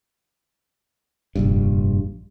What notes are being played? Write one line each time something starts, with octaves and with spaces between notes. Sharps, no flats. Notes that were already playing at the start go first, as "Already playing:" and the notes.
F1 A#1 G2